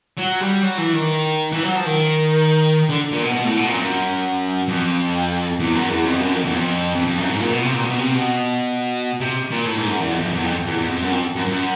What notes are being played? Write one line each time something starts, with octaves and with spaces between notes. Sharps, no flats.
F#3
G3
F#3
E3
D#3
E3
F#3
F3
D#3
D3
A#2
B2
B2
A2
B2
A#2
F2
F#2
F2
E2
F#2
E2
F2
F#2
F2
E2
F2
F2
F2
F#2
G#2
A#2
B2
C3
A#2
B2
C3
B2
C3
A#2
A2
G#2
F#2
E2
F2
F2
E2
F2
E2
E2
F2
F#2
F2
F#2
F#2